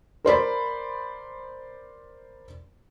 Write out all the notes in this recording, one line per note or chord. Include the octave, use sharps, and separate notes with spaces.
A#4 C5 D5 B5